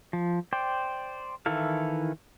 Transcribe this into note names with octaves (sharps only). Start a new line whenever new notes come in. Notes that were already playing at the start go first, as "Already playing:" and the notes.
F3
C5 D5 G5
D#3 E3 E4 A4 F5